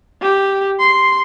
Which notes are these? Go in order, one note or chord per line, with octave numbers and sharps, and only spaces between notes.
G4
C6